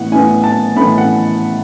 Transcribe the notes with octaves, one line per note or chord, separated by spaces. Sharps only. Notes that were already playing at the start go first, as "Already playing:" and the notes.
Already playing: A2 E3 B3 F#5
A2 E3 B3 G#5
A5
A2 E3 B3 B5
F#5